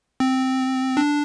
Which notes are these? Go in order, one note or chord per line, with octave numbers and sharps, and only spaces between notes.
C4
D4